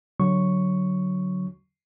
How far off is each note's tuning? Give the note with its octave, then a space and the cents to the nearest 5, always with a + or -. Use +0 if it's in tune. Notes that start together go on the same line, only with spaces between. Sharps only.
D3 -15 F#3 +0 C#6 +0